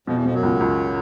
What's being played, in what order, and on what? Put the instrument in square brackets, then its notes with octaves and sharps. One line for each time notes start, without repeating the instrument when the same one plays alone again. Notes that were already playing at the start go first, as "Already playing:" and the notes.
[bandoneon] F2 F3 [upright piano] B2
[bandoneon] E2 E3
[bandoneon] F2 F3 [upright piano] B2
[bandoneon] F#2 F#3
[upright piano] C#2
C#2